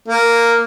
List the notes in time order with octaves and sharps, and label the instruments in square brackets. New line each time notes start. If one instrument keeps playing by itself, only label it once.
[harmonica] A#3